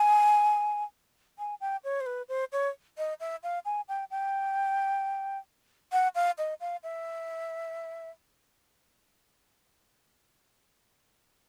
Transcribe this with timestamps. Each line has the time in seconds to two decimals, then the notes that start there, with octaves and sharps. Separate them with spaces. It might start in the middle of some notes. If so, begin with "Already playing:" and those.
Already playing: G#5
1.39 G#5
1.61 G5
1.84 C#5
2.01 C5
2.06 B4
2.29 C5
2.52 C#5
2.98 D#5
3.20 E5
3.43 F5
3.65 G#5
3.89 G5
4.11 G5
5.92 F#5
6.15 F5
6.38 D#5
6.61 F5
6.83 E5